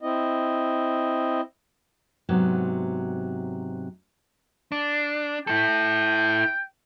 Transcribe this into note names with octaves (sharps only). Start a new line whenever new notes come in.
C4 E4 D#5
G#2 C3 F#3 B3
D4
E4 A4 G5